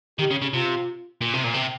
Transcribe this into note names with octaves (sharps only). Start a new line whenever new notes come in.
D#3 G4
C#3
C#3
C3 F4
A#2
C3
A#2
C3